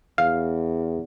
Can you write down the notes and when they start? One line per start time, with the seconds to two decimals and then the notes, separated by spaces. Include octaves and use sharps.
0.18 E2 F5